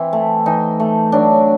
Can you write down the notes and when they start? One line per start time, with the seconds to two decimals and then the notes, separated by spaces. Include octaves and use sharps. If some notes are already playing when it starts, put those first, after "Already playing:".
Already playing: E3 C4 E4
0.13 A3
0.46 E3 D#4
0.80 A3
1.12 F#3 D4